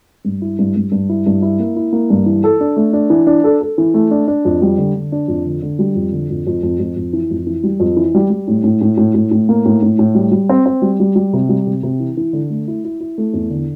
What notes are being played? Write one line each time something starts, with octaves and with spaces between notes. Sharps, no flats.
G2
E4
G2
G2
G2
E4
G2
E4
A#3
E4
A#3
G2
E3
A4
D4
A3
D4
E3
D4
A4
A4
E3
A3
D4
D4
F2
G3
D3
D3
D4
F2
D3
D3
G3
F2
D3
F2
F2
F2
F2
F2
E3
F2
E3
G3
F2
E3
G3
G3
A2
A2
A2
A2
A2
A2
A#3
A2
A2
A2
G3
G3
C4
C4
G3
G3
G3
C3
G3
C3
C3
E3
E3
D3
A3
E4
E4
E4
A3
E2
D3